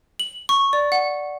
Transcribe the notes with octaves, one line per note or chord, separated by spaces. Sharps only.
F#7
C#6
D5
F#5